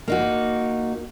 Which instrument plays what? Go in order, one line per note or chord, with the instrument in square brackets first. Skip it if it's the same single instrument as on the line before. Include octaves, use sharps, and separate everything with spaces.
[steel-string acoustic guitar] A#3 D#4 F#4